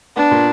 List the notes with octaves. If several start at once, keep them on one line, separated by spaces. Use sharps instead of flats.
B3 D4
A#2